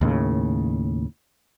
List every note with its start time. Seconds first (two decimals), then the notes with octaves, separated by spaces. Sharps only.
0.01 D#2 A2 C#3